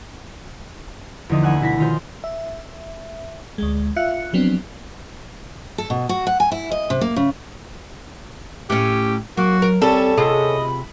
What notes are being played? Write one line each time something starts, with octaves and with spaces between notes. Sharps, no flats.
E2 D3 F3 D#4 D#5
D2 F#5 G#5 F#6
B2 E4 A#6 B6
D#3 F4 C5
E5
D2 G#3
F4 E5 F5 F#6 C#7
F3 F#3 B3 C4 D4
A4
B2
F#4
F#5
G#5
E4
D#5
C3
A#3
C#3
A2 C#4 G4
F#3 A#3 F#4
A#4
G3 C4 C#4 A4
C3 F4 G#4 D#5 B5